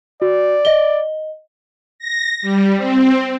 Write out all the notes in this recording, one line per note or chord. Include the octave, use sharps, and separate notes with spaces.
F#4 D5
D#5 G7
A#6
G3
C4